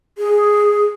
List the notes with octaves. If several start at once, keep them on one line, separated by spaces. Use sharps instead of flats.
G#4